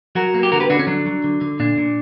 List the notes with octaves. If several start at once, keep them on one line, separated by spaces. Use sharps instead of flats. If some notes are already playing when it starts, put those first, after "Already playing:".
F#3 F#4 A#4
A#3
G4
D3 F#4 A#4
G4 B4
D3 D4 F#4
C#4
F#3 D4
F#3
D3
D3
A#2 D4
A#2